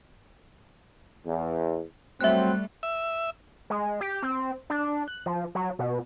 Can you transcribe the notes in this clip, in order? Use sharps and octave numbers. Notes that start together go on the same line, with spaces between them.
E2
F#3 G3 A3 C4 E5 F#6
E5
G#3
G4
C4
D4
F#6
F3
F#3
B2